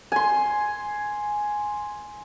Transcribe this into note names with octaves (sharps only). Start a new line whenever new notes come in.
G#5 C6